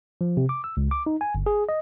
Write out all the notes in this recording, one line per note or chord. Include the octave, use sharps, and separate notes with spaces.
F3
C3
D6
E6
C#2
D6
D#4
G#5
G1
G#4
D#5